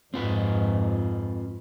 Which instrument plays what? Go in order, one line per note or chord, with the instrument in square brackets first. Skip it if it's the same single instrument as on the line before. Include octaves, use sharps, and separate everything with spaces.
[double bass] F2 G#2 [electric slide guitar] C4 F4 B4